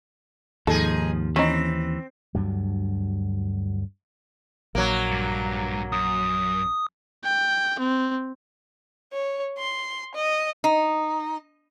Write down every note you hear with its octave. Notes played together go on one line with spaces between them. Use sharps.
D#2 G#2 F3 D#4 G#4 A4
E3 C4 C#4 D#4
D2 G2 F#3
A#1 F#3 A#3
G2
F#2 D#6
G5
C4
C#5
C6
D#5
D#4